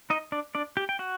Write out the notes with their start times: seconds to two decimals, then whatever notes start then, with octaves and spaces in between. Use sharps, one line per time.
0.10 D#4 D#5
0.32 D4 D5
0.55 D4 D5
0.77 G4 G5
0.89 G5
0.99 F#4 F#5